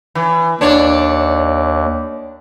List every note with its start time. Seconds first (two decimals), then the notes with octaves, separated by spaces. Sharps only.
0.15 E3
0.61 D#2 D4 C#5